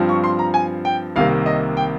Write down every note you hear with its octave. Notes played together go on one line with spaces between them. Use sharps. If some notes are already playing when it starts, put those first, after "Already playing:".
Already playing: G2 F3 C4
C#6
C6
A#5
G#5
G5
C2 C3 D#3 A#3 F5
D#5
G5